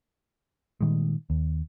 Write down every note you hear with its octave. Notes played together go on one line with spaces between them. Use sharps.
A#2 D#3 G3 G#3
D#2